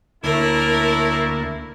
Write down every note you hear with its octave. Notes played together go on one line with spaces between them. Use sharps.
D2 A2 A#3 E4 A#4